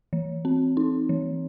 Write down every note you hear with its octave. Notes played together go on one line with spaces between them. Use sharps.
E3
C4
D#4
E3